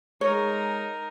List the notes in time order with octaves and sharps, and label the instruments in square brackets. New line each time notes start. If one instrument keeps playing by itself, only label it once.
[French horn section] G#3 [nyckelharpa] D#4 A#4 [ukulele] C#5